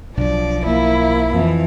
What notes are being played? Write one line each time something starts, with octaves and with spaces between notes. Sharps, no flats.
B1 F3 F#3 D4 D5
A#3 E4
F2 E3